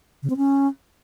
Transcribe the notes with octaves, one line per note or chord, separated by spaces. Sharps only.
C#3
C4
C#4